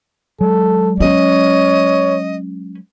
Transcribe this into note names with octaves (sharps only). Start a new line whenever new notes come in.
F#3 G#3 A4
C#4 C#5 D#5